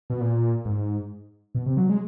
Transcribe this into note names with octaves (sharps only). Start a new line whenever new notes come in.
B2
A#2
G#2
B2
C3
F#3
G#3